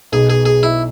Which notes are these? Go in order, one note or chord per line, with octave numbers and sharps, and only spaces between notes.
B1 B2 B3 G#4
G#4
G#4
E4